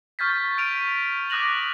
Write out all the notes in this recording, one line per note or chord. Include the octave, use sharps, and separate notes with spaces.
C#6 F6 G6 A6 B6
F6 D7 D#7 F7
D6 D#6 F#6 A#6 F7 F#7